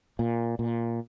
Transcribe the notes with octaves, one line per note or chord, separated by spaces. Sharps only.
A#2
A#2